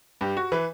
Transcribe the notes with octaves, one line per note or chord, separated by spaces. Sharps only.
G2 G4
F#4
E3 B4